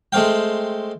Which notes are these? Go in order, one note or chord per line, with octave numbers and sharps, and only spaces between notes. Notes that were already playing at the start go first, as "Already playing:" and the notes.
G#3 A3 C4 F5 G5